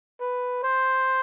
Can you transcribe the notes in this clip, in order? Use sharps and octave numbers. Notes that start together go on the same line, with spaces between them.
B4
C5